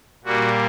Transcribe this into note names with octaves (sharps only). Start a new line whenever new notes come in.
A#2 G3 A#3 F#4